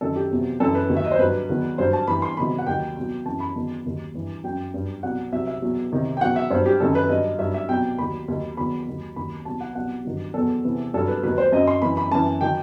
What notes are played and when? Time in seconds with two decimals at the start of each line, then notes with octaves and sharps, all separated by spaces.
0.01 F#2 D#3 F#3 A4
0.16 G4
0.31 E2 C3 F#3
0.60 F#2 E3 A4
0.75 B4
0.89 D#2 D#3 F#3
0.97 E5
1.04 D#5
1.12 C5
1.19 G2 F#3 B4
1.49 E2 D#3 F#3
1.78 G2 F#3 C5
1.93 A5
2.08 G2 E3 B5
2.22 C6
2.37 E2 C3 D#3 F#3 B5
2.58 F#5
2.66 D#2 D#3 F#3 G5
2.96 C2 B2 F#3
3.25 F#2 E3 A5
3.40 B5
3.55 E2 D#3 F#3
3.85 D#2 D#3 F#3
4.14 G2 E3
4.44 F#2 F#3 G5
4.74 G2 F#3
5.03 C2 B2 F#3 F#5
5.32 C2 C3 F#3 E5
5.47 E5
5.62 E2 B2 F#3
5.92 C2 C3 D#3
6.17 G5
6.21 E2 B2 F#3 F#5
6.36 E5
6.50 G2 F#3 C5
6.66 G4
6.80 F#2 D#3 F#3 A4
6.95 B4
7.09 G2 F#3 D#5
7.39 G2 F#3 E5
7.54 E5
7.69 C2 B2 F#3 G5
7.98 D#2 D#3 F#3 B5
8.28 D#2 D#3 F#3
8.57 E2 D#3 F#3 B5
8.87 D#2 D#3 F#3
9.16 D#2 D#3 F#3 B5
9.45 C2 B2 F#3 A5
9.61 F#5
9.75 C2 B2 F#3 F#5
10.05 G2 D#3 F#3
10.34 E2 B2 F#3 A4
10.64 E2 C3 E3
10.94 G2 F#3 A4
11.08 B4
11.23 D#2 D#3 F#3 B4
11.38 C5
11.52 F#2 F#3 D#5
11.67 C6
11.82 F#2 E3 B5
11.97 B5
12.11 F#2 E3 A5
12.41 D#3 F#3 G5